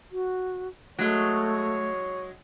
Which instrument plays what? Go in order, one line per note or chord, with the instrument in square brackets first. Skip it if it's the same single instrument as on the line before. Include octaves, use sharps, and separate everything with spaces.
[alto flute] F#4
[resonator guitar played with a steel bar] F#3 G#3 [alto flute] A3 [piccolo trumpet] C#5